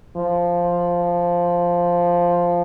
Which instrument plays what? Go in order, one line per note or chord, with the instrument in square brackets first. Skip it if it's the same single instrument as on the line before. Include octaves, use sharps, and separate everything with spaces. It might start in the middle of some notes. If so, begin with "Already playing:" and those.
[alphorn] F3